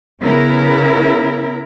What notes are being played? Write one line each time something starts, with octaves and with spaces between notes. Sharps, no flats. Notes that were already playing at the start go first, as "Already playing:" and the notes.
C#3 B3 E4 A#4